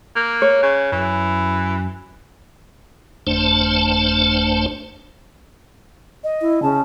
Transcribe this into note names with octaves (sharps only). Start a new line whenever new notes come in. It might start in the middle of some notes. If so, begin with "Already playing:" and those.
A#3 F#6
C#5
C#3
F#2 E3
G1 F2 A3 D4 C5 A5
D#5
E4
C#3 A5